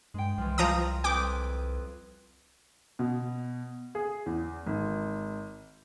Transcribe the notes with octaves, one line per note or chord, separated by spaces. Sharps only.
G2 G#3 G5
C2 E3 F3
F3 G3 F4 A#5 D#6
F2 B4 G5 D6 D#6
B2
G#4
E2
G#1